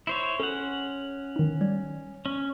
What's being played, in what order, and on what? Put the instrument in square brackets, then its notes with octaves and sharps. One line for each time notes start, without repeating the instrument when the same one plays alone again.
[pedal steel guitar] E4 C5 C#5
[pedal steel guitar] C#4 F#5 [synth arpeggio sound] A4
[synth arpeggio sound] D#3 D#4
G3 D5 G#6
[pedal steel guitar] C#4